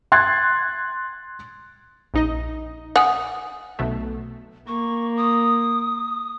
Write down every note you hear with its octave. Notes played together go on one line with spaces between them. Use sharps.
C6 F#6 G#6 A6
A#1 D#4 D#5
F#5 G#5 D#6
B1 B2 A3
A#3 C#6
D#6